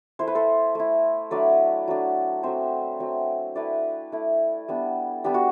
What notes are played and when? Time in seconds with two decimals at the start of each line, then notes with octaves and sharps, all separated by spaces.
0.19 A3 E4 C5
0.27 B4
0.35 A4 C5
0.75 A3 E4
1.31 F#3 A3 D4 B4 D5
1.88 F#3 A3 D4
2.43 F#3 A3 C4 C5 E5
3.00 F#3 A3 C4
3.56 A3 E4 B4 D5
4.12 A3 E4
4.68 G3 B3 D4
5.24 G3 B3 D4 G4
5.34 F#4